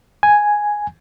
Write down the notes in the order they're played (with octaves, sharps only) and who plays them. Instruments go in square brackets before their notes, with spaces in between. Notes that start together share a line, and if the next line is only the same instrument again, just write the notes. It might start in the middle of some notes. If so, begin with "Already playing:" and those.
[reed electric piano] G#5